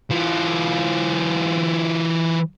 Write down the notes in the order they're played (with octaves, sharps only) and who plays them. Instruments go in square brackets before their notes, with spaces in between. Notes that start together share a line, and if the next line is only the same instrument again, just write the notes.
[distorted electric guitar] E3 F4